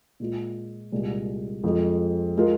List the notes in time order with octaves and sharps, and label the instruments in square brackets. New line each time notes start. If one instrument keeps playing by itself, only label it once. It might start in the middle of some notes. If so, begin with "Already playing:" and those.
[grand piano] A#2 G#3 F4
C2 A#2 G#3
F2 F3 G#3 F4
G#3 F4 A#4